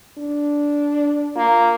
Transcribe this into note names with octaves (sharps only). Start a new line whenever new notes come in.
D4
A#3 F4